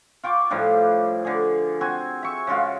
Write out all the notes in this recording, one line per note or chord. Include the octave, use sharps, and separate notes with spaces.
F4 G5 C#6 D6
A2 F3 G3 D4
D3 G#4
C4 F#4 G#5
E5 C#6
C#3 G#3 F4 F#4